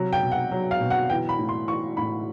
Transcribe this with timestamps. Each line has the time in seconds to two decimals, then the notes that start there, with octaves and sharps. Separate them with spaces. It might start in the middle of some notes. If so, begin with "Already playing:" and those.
Already playing: C3 F#3
0.13 G5
0.23 B2
0.32 F#5
0.51 F#3
0.71 F5
0.80 B2
0.90 F#5
1.10 E3 G5
1.29 B5
1.39 A2
1.49 C6
1.68 E3 C#6
1.97 A2 B5